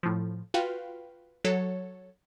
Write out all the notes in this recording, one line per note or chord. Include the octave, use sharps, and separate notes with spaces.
A2 F3
F4 F#4 B4 F5 G5
F#3 A4 C#5